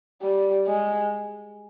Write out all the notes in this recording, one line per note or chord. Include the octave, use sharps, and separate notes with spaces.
G3
G#3